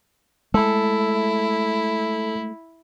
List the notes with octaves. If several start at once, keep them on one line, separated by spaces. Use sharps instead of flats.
G#3 A3 E4 A4